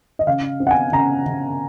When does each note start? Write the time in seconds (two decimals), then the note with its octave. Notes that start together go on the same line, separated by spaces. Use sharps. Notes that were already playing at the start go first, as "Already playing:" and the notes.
0.19 D#5
0.27 C#3 F5
0.60 C4
0.67 F#5
0.71 G#5
0.92 C#3 A#5
1.26 C#3